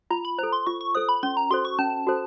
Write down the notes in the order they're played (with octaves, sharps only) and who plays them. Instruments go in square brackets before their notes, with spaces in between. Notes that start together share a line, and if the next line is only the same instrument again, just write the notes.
[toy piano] F4 [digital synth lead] A#5
[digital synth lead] B5
[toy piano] A4 C5 [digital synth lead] A#5
[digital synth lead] C6
[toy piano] F4 [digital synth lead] C#6
[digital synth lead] C#6
[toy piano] A4 C5 [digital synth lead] D#6
[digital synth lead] B5
[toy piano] C#4 [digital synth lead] C6
[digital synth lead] A#5
[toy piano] F#4 A4 C5 [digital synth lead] C6
[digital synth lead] C#6
[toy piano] C#4 [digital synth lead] A5
[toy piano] F#4 A4 C5